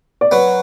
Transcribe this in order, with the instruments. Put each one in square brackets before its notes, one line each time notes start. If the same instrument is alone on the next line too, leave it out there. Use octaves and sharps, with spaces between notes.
[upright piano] D5
[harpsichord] F#3 [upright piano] B4